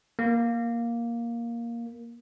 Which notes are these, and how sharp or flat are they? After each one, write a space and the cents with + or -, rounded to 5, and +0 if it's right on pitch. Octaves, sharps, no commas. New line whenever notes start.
A#3 +5